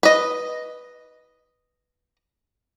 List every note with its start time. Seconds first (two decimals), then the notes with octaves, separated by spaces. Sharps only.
0.03 B4 D#5